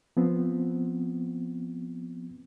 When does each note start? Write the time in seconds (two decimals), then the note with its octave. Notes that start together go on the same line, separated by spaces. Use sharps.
0.17 F3 B3 C4